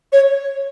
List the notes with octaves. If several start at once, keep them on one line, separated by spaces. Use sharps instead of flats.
C#5